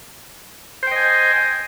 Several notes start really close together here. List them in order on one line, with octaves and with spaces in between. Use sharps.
C5 G5 D#5 G#5